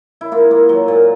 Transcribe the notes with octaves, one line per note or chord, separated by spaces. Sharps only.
E4
A#3 F4
A#3
F#3
A#2